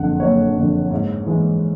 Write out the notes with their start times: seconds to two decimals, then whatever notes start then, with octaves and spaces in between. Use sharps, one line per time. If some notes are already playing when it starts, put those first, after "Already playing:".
Already playing: F#1 F2 D3 F#5
0.20 F#1 C#5
0.56 F2 D3
0.91 G#2
1.26 E3 G#3